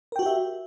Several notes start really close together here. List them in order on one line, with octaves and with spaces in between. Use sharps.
A#4 G5 F#4 G4 E5